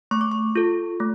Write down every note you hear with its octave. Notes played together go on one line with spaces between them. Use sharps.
A3 C#6
D6
C#6
F4 A4
A3